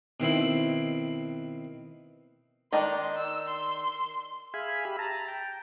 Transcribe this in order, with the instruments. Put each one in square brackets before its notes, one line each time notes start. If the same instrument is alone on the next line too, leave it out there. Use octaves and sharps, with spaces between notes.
[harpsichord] B2 D#3 C4 E4
[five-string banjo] D#3 D4 D#4 [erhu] C6
[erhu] E6
C6
[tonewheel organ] G#4 E5 F5 G#5 B5
G4 E5 B5
A5 A#5
G5